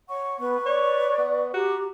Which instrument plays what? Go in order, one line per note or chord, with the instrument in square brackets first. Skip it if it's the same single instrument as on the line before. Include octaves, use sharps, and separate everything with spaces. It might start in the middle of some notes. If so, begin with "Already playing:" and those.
[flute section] C#5 F#5 C#6
[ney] B3 [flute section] B4 C#6
[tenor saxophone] C#5 [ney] D5
[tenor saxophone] B3
[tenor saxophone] F#4 [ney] G4 [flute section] A#5